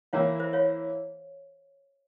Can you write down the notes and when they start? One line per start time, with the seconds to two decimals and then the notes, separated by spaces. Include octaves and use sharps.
0.13 E3 A#3 E4 C#5 F5
0.40 C5 E5
0.53 C#5 F5